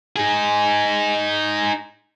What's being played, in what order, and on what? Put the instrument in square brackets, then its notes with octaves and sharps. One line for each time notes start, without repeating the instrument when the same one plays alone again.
[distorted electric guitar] D#4 G#4